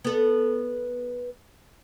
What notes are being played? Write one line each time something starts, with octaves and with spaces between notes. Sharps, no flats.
B3 A4